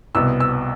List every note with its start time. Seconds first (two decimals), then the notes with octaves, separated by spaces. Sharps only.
0.15 C2 B2 B3 E6
0.40 E6